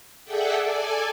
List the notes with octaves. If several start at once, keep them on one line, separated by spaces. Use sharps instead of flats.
G#4 A4 D5 E5 F#5 G5
A4 D5 G#5